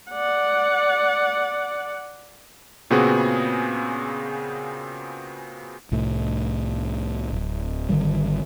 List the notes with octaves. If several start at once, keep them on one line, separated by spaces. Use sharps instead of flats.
D5 F#5
A#2 C#3 B3 C4 F#4 G#4
C2 A2
D1
G#1 D3 D#3 G3